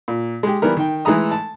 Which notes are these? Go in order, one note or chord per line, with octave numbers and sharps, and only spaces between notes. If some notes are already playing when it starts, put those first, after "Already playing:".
A#2
G#3 G4
E3 G3 B3 A#4
D#3 G5
E3 G#3 A3 A4 A#5 D#6
A5